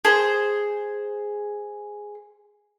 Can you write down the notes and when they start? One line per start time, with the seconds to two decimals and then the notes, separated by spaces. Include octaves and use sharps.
0.05 G#4 C5